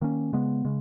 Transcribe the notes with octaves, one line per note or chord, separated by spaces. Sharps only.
D#3 A#3 C#4
C#3 G#3 B3
C#3 G#3